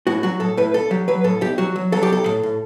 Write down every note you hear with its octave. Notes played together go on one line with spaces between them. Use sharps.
A2 F#4
F#3 F#4
A2 A4
A2 B4
B1 A4
F#3 G4
F#3 B4
A2 A4
B1 G4
F#3 F#4
F#3
F#3 A4
G4
B1 A4
A2
A2